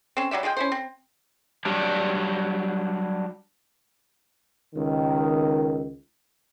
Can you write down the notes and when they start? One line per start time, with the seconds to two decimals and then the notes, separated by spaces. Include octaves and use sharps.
0.17 C4 C#4
0.31 F#3 G3 D5 E5
0.43 G#3 F4 G#4 G5
0.57 C#4 E4 C5
0.72 C4
1.65 F#3 G3 D4
4.75 C#2 D#3